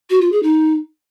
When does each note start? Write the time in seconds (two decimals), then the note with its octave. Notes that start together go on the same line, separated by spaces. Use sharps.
0.10 F#4
0.21 F4
0.32 G#4
0.43 D#4